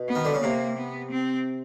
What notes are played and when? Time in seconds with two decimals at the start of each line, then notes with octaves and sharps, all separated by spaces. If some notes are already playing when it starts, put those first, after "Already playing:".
Already playing: B2
0.08 B3
0.15 D#3
0.25 D3
0.34 C#3
0.43 C3 A#3
0.78 B3
1.11 C4